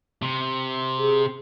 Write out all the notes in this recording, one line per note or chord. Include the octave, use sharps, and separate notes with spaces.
C3
G#4